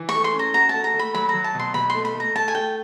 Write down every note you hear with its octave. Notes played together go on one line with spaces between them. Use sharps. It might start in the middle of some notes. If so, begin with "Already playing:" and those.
Already playing: E3
C#6
A3
C6
C#4
A#5
F#4 A#5
A3 A5
A#5
A3
B5
F#3 B5
A#5
F#3
A5
B2 C6
B2 B5
C6
A3
B5
A3
A#5
A3 A5
G#5
A3 G5